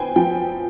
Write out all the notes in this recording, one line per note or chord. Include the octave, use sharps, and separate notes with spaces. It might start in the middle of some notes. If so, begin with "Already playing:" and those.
Already playing: B3 D4 C5 G5 G#5
F3 G5